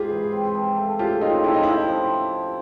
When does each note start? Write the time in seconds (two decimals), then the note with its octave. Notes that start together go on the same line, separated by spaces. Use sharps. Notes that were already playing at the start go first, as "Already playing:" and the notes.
Already playing: G#2 F4 G4 G#4
0.10 E3
0.32 C4
0.54 F3
0.77 A3
0.99 C#3 F4 G4
1.21 C4 D#4 F4
1.44 F3 E4
1.54 D#4
1.63 C3 E4
1.88 F3